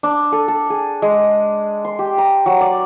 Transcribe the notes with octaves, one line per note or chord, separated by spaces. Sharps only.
D4
A4
A4
G#4
G#3
C6
G4
A#5
F#3
D5